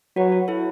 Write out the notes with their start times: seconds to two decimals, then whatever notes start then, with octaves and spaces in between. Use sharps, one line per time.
0.16 F#3 F#4 B4
0.32 F#4
0.48 E4 A4